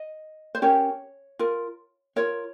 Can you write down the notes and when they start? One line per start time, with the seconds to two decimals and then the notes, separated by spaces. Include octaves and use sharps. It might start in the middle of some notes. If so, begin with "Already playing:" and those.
Already playing: D#5
0.55 C5
0.62 C#4 G4 A#4 C#5
1.39 F4 A#4
2.16 F4 A#4 C#5